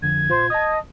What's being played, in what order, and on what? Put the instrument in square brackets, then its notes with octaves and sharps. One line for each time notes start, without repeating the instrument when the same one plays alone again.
[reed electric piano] F2 D3 F3 [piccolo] G#6
[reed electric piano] A#2 F4 [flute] C5
[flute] D#5 [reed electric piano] A5 D#6